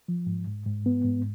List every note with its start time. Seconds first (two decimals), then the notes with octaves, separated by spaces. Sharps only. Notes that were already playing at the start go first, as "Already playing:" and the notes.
0.08 F3
0.27 G#2
0.47 G#2
0.66 G#2
0.86 B3
1.05 G#2